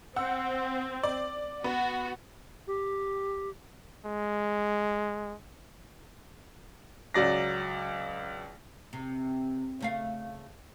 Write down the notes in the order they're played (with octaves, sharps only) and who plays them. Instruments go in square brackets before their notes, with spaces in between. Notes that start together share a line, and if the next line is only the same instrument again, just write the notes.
[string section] C4 [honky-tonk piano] F#5 E6
[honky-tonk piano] D5
[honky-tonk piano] B3 [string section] F#4
[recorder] G4
[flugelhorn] G#3
[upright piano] C#2 F#3 D5 A#6
[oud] C3
C#3 A3 F5